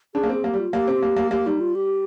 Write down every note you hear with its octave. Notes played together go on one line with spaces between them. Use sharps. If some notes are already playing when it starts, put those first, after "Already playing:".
D4 G#4
A#3
C4 G#4
A#3 G4
G3
F4
A#3 G4
C4
A#3
A#3
A#3 G4
G3 D#4
F4
G4